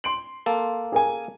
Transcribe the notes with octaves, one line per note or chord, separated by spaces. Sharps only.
C6 D7 F#7
A#3 A4
G#4 A#4 G#5